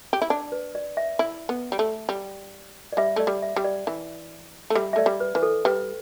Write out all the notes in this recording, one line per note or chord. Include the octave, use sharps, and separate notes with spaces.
G4
E4
D4 D5
B4
D5
E5
E4
B3
G3
A3
G3
D5
G3 E5
A3 D5
G3
E5
G3
D5
E3
A3
G3 E5
E5
A3 D5
G3
B4
E3 B4
A4
G3 B4